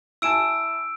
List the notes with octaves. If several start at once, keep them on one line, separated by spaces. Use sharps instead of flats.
E4 G#5 A5 E6 D7 E7